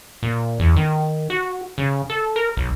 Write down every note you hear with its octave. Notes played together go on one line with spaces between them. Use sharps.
A#2
E2
D#3
F#4
C#3
A4
A#4
B1